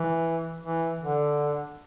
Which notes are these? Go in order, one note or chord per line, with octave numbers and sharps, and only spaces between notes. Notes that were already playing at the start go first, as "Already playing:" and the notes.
Already playing: E3
E3
D3